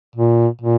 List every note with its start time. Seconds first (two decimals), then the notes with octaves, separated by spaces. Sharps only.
0.16 A#2
0.61 A#2